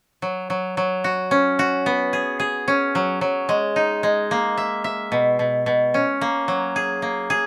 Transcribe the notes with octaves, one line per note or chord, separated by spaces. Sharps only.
F#3
F#3
F#3
F#4
C#4
F#4
B3
G#4
G#4
C#4
F#3
F#3
G#3
D#4
G#3
A#3
E5
E5
B2
B2
B2
C#4
A#3
F#3
G#4
A#3
G#4